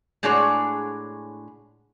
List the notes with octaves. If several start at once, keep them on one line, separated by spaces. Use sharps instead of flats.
A2 G#3 D4 F#4 G#4 C#5